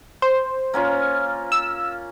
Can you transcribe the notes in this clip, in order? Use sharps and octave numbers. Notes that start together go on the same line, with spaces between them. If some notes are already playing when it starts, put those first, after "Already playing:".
C5
A#3 C#4 F4
E6